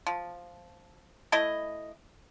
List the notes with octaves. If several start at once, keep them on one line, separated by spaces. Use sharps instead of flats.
F3
A3 E4 D#5